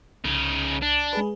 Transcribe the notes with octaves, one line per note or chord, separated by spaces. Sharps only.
C2 C#3 D#4
D4
G#3 G#4 B4